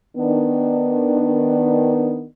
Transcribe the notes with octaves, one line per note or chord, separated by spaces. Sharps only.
D#3 B3 D4